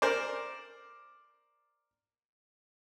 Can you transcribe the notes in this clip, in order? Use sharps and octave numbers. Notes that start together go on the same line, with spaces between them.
A#4 C5 D5